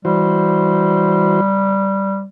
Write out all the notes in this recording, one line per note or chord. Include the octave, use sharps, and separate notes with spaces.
E3 G3 F#4 C5